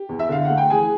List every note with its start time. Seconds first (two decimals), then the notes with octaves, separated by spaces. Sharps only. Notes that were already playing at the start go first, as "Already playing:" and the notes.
Already playing: G4
0.09 E2
0.19 E5
0.29 D3 F5
0.45 A3 F#5
0.57 G5
0.70 E3 G#4 G#5